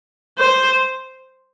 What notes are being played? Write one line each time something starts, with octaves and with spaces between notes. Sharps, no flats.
C5